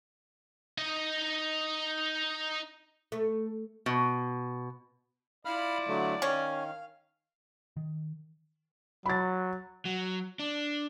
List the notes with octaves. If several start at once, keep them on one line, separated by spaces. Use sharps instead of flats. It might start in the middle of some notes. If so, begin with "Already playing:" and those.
D#4 D#5
A3
B2
E4 F4 D5 F5 B5 F6
D3 F#3 A3
D#3 C#4 F5
D#3
F#3 B5 A6
F#3
D4